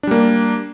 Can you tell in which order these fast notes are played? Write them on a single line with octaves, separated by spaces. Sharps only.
D4 G3 A#3